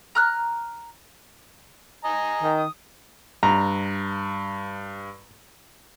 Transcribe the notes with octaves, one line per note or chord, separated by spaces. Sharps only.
A#5 F6 F#6
D#5 G#5 A#5
D#3
D#6
G2 A#5